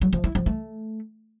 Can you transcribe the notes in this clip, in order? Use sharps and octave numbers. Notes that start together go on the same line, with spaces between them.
F#3
F3
E4
F3
A3